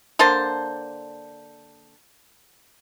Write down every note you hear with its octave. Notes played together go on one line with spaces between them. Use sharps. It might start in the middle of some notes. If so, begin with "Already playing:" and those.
D3 A#3 C5 A5